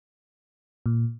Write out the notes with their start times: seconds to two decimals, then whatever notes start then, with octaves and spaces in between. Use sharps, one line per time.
0.86 A#2